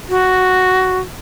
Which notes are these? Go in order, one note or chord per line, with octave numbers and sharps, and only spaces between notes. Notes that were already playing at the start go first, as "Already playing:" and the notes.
F#4